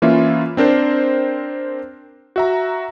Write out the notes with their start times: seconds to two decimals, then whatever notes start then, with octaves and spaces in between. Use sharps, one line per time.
0.02 E3 A#3 C#4 E4 F4 E5
0.57 C4 D4 A#4 C5
2.36 F#4 E5 A#5